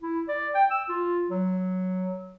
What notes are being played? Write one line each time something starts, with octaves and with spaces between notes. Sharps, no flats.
E4
D5
G5
E6
F4
F#3